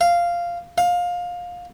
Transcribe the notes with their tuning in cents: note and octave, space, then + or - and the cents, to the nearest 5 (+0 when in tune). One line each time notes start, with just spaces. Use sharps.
F5 -10
F5 +20